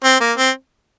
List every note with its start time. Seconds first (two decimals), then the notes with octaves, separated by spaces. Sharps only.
0.04 C4
0.21 A#3
0.38 C4